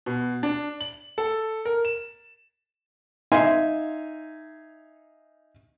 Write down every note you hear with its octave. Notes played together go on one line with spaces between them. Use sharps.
B2
D4
F#7
A4
A#4
E7
D#4 E5 F5 G#5 C6